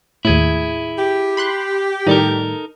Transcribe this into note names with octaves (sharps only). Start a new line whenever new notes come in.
D#2 A2 E4 G#4
G4
B5 C6 F#6
A2 D#3 G3 D#4 A4 A#4